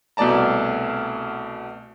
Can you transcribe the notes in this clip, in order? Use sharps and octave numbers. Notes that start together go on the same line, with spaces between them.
C2 B2 A3 D5 A5 A#5